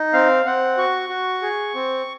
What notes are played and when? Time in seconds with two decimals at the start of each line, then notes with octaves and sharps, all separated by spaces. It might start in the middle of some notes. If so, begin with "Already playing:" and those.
Already playing: D#4
0.13 C4 F5
0.46 C4 F#5
0.77 F#4 C#6
1.09 F#4
1.42 G#4
1.75 C4